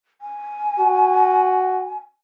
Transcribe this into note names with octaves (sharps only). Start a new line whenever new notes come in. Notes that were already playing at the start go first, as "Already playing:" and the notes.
G#5
F#4